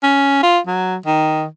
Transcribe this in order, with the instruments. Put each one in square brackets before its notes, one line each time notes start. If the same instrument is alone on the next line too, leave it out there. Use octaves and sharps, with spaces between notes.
[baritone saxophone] C#4
F4
F#3
D#3